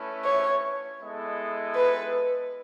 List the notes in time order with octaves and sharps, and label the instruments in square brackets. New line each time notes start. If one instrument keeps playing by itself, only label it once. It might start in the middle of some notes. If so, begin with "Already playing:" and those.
Already playing: [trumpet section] A3 C#4 E4 B4 E5
[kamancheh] C#5
[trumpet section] G#3 B3 E4 A4 D#5
[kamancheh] B4